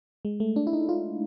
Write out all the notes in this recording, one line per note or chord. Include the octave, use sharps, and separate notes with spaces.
G#3
A3
D4
E4
D#4
F4